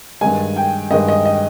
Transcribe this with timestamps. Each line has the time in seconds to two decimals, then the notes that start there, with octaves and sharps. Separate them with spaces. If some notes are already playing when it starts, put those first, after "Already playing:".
0.21 G2 D#3 G#3 G#5
0.56 G5
0.91 G2 D#3 G#3 D#5
1.08 D#5
1.25 D#5